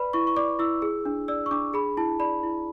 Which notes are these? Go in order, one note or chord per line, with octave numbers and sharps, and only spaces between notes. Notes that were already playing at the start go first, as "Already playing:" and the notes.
Already playing: B4 D5 B5
E4 C#6
C#6
D5 D6
E4 E6
G#4
D4
D5 E6
C#6
D4 D6
G#4 B5
E4 A5
D5 B5
E4